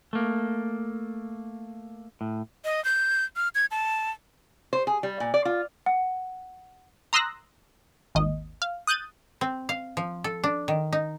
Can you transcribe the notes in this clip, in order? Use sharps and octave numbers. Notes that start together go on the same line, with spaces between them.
A3 A#3
A2
D#5
G6
F6
G#6
A5
C5
G#4
G3
A#2
D5
F4
F#5
A#5 C6 D#6 E6 F#6 A#6
G#1 D#2 D#5
F5
D#6 F#6 G6 A6 D#7
C4
F5
F3
A4
D4
D#3
D#4